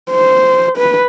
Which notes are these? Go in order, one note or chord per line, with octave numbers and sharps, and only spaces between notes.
C5
B4